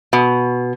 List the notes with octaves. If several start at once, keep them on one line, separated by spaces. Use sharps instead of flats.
B2